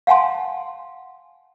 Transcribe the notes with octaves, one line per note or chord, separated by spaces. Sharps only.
F5 F#5 G#5 A5 C6